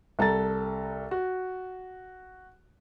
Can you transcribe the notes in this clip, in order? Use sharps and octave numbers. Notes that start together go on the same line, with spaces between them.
C2 A4 A#5 A6
F#4